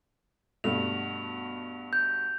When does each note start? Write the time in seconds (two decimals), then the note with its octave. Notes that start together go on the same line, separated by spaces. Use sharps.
0.64 G2 B2 A3 F7
1.93 G6